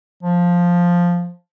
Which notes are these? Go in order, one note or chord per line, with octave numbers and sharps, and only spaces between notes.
F3